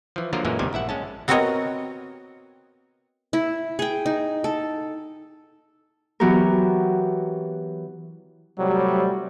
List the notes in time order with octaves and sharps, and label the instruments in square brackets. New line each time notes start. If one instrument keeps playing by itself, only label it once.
[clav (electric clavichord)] E3 F3
D3 F3 F#3 A#3 F4 A#4
F#2 A#2 E3 F#3 G#3 A#3
B1 G#2 C3 D#3 G3 G#5
A#1 E4 E5 F#5
G#3 C#4 A5
[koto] B3 C4 F#4 A#4 C#5 D#5
[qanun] E4
G#4 G5
D#4
A4
[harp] E3 F#3 B3 F#4 G4 A#4
[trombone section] A2 C3 G3 [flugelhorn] F#3